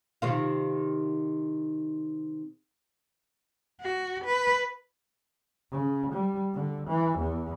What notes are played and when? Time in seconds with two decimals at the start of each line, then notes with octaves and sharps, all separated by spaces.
0.22 C3 D#3 F4
3.81 F#4
4.25 B4
5.71 C#3
6.13 G3
6.54 D3
6.88 E3
7.19 E2